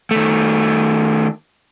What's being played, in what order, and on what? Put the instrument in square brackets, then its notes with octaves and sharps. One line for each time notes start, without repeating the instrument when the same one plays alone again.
[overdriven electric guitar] D#3 A3